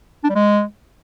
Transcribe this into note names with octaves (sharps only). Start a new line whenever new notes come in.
D4
G3
G#3